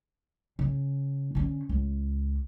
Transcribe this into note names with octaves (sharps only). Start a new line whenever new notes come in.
C#3
D3 C#4
C#2